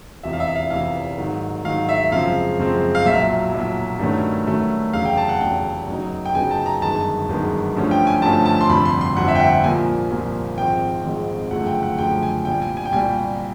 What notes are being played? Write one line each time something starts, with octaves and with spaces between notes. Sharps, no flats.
F1 E2 C3 E3 E5
F5
E5
F5
F1 E2 C3 E3 F5
G#2 D#3 F#3
G#2 D#3 F#3 F5
E5
F#2 C#3 F3 G#3 C4 F5
F#2 C#3 F3 G#3 C4
F5
B1 A#2 F#3 E5
B1 A#2 F#3
G2 D#3 F#3 A3 C#4
G2 D#3 F#3 A3 C#4
F1 E2 C#3 F#3 F5
G5
A5
F#5
F1 E2 C#3 F#3 G5
F#2 C#3 F#3 B3 D#4
G5
F#2 C#3 F#3 B3 D#4 G#5
A5
A#5
G1 F#2 D#3 G#3 B3 A5
G1 F#2 D#3 G#3 B3
G2 D3 F3 A3 C#4
G5
G#5
G2 D3 F3 A3 C#4 A5
A5
C6
G1 F2 C3 B5
C6
C6
G1 F2 C3 F#5
E5
G5
F#5
C2 A#2 F3 A#3 G#5
C2 A#2 F3 A#3
G#1 G#2 F3 G#3 C4 G5
G#1 G#2 F3 G#3 C4
G1 F#2 C#3 F3 A3 F#5
G5
F#5
G1 F#2 C#3 F3 A3 G5
G#5
C2 A#2 G3 G5
G#5
G#5
G5
C2 A#2 G3 G#5